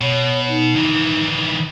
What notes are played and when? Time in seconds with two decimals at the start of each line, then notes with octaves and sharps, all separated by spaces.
0.01 B2 C#5
0.49 D#4
0.76 D#3 E3